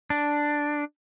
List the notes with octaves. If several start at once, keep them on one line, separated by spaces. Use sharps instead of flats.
D4